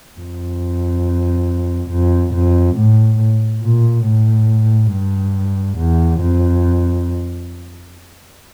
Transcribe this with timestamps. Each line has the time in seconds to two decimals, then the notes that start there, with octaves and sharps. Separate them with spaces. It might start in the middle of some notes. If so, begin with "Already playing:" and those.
0.18 F2
1.91 F2
2.34 F2
2.76 A2
3.63 A#2
4.05 A2
4.92 G2
5.77 E2
6.21 F2